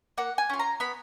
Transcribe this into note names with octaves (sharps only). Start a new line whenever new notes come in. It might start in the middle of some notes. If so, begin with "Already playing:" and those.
A#3 F#5
G#5
C#4 F4
A#5
B3 B5